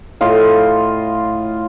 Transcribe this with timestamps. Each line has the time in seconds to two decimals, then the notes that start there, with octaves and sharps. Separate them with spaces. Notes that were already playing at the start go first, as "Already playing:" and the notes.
0.21 A2 F4 D#5